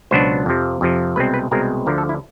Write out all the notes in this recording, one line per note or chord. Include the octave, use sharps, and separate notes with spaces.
C#2 B2 F#3 B3 D4 C5
F2 C3 F3
F2 C3 F3
C2 B2 G#3 C4 B4
B4
C2 B2 G#3 C4 A#4
D2 D3 F3 A#4
A4
E4